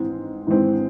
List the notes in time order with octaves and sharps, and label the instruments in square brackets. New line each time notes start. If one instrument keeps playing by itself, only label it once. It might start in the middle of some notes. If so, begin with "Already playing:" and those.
Already playing: [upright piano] G#2 E3 G#3 C4
G#2 E3 G#3 C4